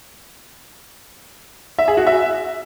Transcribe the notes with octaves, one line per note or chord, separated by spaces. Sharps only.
E5
G#4
F#4
E5